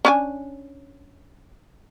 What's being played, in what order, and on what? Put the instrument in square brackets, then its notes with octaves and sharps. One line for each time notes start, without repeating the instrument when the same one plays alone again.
[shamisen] C#4 D4 G#5